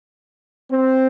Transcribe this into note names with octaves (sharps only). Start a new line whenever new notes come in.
C4